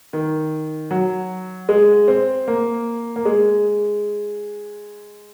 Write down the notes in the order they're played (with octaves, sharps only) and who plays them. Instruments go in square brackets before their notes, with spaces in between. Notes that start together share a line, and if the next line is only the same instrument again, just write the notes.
[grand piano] D#3
F#3
G#3
C4
A#3
A#3
G#3